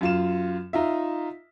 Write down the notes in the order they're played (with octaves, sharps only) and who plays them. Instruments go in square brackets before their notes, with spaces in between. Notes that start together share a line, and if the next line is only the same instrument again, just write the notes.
[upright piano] F#2 F4 E7
D#4 F4 E5